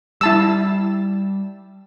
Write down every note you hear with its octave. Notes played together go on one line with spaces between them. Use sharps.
G3 E4 A5 E6